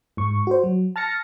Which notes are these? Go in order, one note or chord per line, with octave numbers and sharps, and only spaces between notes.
G#2 C#6
F#4 C5
F#3
A5 F6 A6 A#6 C#7